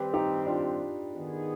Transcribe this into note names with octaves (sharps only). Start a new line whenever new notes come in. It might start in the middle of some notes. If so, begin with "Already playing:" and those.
Already playing: D#3 G3 C4 G4 B4
D#4 G4
D4 F4
D#3 B3 D#4 G#4